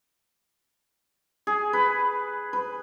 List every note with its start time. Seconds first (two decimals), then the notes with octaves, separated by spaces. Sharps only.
1.47 G#4
1.73 B4
2.53 B4